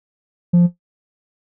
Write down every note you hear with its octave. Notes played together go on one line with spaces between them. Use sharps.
F3